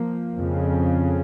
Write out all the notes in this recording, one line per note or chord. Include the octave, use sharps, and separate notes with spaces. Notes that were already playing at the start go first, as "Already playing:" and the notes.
Already playing: F3 A#3
F2 C#3